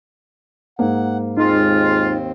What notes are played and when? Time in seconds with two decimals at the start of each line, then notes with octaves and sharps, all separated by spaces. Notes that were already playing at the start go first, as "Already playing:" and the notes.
0.79 G#2 A#3 F#5
1.37 D#2 G#3 C4 D#4 F4